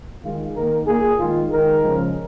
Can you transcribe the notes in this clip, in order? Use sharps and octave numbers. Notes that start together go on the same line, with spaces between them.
D#3 G#3 F4
D#3 A#3 A#4
A#2 A#3 G#4
D#3 G#3 F4
D#3 G#3 A#4
C#3 F3 G#3